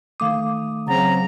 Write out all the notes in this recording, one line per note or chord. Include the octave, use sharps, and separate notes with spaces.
D#3 A3 F5 D6 D#6
C#3 F#3 C4 A#5